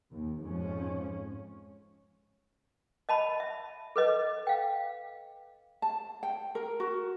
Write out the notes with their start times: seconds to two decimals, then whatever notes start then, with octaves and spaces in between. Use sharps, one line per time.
0.13 D#2
0.42 F2 G#2 F3 C#4
3.09 D#5 A5 B5
3.40 E5
3.96 A4 B4 D#5
4.47 F5 G5
5.82 A5
6.23 G5
6.55 A#4
6.80 F#4